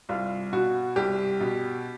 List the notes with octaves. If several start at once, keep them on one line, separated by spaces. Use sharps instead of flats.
C2 F4
B2 F#4
C2 G4
B2